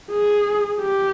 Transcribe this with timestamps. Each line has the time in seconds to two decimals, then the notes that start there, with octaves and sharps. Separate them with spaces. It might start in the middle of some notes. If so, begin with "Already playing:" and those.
0.11 G#4
0.81 G4